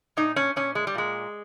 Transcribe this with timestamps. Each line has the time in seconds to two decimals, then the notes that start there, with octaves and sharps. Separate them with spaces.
0.17 A#2 D#4
0.36 C#4
0.56 A#2 C#4
0.75 G#3
0.87 G3
0.95 A#2 G#3